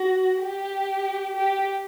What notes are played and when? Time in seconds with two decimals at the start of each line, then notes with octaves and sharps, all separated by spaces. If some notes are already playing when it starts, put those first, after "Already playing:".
Already playing: F#4
0.42 G4
1.35 G4